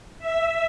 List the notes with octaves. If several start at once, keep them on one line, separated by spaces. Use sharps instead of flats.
E5